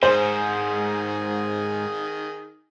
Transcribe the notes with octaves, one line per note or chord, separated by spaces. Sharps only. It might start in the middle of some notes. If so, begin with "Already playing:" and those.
G#2 D#3 G#4 C5